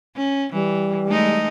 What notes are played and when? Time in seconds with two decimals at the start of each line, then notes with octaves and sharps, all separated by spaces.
0.16 C#4
0.53 E3 G3
1.07 G#3 A3 D#4